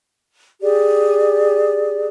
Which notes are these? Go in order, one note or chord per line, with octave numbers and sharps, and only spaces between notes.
G4 G#4 D5